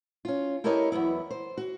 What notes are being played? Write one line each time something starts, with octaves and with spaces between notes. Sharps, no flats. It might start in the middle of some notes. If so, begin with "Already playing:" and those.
C#4 F4
E4 G4 A4 A#4 C#5 D#5
E2 F#3 B3 E4
C5
F#4